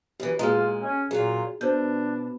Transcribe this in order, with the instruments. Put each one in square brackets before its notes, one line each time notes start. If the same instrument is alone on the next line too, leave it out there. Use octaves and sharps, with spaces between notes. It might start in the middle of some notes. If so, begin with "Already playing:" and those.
[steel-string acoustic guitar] F#2 E3 [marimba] G4
[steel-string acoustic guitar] A#2 G#3 [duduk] F4 [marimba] F#4 G#4 A#5
[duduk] C#4
[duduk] A#2 [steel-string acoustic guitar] F#3 F4 [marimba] G#4
[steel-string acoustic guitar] B2 [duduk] D4 [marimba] C5 G6